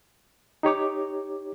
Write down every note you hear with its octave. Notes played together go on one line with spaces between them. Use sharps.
D#4 G4 C#5 D6